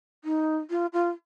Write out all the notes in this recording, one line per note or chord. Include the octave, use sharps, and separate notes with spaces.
D#4
F4
F4